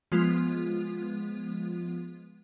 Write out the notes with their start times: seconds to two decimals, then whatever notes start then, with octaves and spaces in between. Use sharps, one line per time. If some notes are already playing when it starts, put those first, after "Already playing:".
0.12 F3 G#3 B3 F4